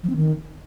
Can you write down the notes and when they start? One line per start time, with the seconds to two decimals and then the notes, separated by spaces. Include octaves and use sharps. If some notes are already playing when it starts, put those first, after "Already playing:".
0.03 F3
0.10 C4
0.16 D#3